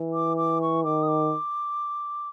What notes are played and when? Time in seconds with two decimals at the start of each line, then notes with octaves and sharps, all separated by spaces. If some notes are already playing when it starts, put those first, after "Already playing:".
Already playing: E3
0.14 D6
0.37 D6
0.62 C#6
0.84 D#3 D6
1.03 D#6
1.08 D6